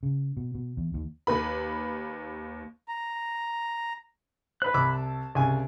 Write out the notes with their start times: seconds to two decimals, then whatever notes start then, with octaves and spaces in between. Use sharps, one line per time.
0.03 C#3
0.37 B2
0.55 B2
0.77 E2
0.94 D#2
1.27 D#2 B4 B5
2.88 A#5
4.62 B4 C5 B5 F#6
4.74 C2 D6 E6
4.93 A5
5.35 C2 C#3 G#5